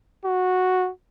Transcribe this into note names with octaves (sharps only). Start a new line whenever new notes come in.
F#4